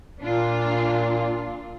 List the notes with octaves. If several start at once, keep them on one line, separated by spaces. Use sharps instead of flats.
A#2 D4 F4